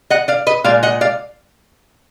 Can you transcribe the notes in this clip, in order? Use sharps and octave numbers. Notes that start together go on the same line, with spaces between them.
D#5 F#5
D5 F5
B4 D#5
A#2 G#3 D5 F5
D#5 F#5
D5 F5